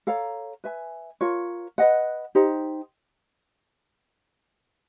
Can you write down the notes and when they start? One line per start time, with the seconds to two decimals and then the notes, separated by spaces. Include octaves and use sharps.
0.07 A4 C#5 F5 A#5
0.64 B4 E5 G#5
1.21 F4 A#4 C#5
1.78 B4 D#5 F#5
2.35 D#4 G4 C5